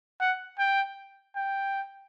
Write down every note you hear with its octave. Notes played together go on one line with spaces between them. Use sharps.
F#5
G5
G5